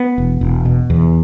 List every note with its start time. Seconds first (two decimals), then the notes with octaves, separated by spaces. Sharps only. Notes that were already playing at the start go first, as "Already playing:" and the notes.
Already playing: B3
0.18 E1
0.41 E1
0.65 B2
0.90 E2